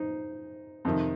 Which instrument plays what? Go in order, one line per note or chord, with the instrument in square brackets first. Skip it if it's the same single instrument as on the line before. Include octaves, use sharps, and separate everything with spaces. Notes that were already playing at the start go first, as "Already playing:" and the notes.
Already playing: [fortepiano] D#4 C5
F2 C3 D#3